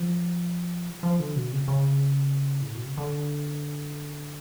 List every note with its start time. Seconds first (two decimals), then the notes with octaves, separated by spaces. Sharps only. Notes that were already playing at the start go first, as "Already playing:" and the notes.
Already playing: F3
1.03 F3
1.20 D3
1.36 B2
1.52 C#3
1.68 C#3
2.62 A2
2.74 B2
2.86 C#3
2.98 D3